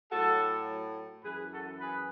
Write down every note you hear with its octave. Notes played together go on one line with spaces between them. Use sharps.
A2 F#3 F#4 A4
F#2 E3 G#4 B4
F#4 A4
G#4 B4